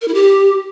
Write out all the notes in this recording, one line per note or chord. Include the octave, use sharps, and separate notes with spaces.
A#4
E4
G4